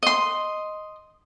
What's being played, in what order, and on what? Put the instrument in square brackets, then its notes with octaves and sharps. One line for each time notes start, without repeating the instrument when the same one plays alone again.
[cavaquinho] D#5 C6